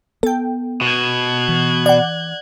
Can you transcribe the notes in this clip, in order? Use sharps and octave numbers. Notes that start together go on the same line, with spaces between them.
B3 A4 G5
B2 F#6 G#6
E3
D5 F#5